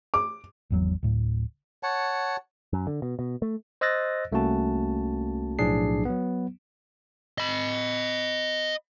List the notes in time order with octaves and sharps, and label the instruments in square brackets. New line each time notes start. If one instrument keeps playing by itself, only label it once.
[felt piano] D6
[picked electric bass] G#1 E2 F#3
D1 A2
[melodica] C#5 F#5 A5
[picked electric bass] F#2
D3
B2
B2
A3
[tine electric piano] C5 D#5 E6 F#6 A6 A#6
C2 A3 A#3 C#4 F#4 A5
B1 A2 F3 D4 G#4 C7
F#3 B3
[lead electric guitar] D#5 B5